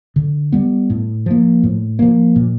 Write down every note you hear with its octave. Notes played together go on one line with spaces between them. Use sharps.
D3
G3 B3
A2
F3 A#3
A2
F3 A#3
A#2